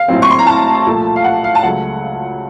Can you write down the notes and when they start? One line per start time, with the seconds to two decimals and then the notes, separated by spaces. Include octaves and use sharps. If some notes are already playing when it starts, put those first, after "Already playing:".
Already playing: F5
0.08 A#1 A2 F#3 C4
0.22 C#6
0.31 C6
0.39 A#5
0.46 A5
0.86 C2 A#2 F3 A3
1.16 F5
1.24 F#5
1.44 F5
1.55 A5
1.63 C#2 C#3 F#3 A3 F#5